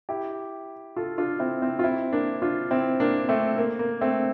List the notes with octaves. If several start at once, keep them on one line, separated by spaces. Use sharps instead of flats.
E4 G4
F4 A4
D4 F4
C4 E4
C4 E4
F4
C4 E4
A#3 D4
D4 F4
C4 E4
A#3 D4
A3 C4
A#3
A#3
A3 C4